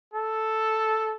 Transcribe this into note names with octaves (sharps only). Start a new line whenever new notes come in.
A4